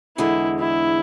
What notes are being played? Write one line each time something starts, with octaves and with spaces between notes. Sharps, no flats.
E2 D3 G#3 E4
E4